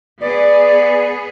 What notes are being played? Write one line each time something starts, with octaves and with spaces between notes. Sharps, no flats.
B3 G#4 D5